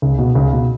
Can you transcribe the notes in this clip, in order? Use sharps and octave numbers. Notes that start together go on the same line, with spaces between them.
C#2
B2
C#2
B2